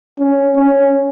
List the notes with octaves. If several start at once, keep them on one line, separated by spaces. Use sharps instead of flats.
C#4
C#4